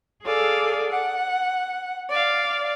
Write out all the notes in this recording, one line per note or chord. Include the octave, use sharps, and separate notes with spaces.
G#4 A4 D5 F5
F#5
D5 F5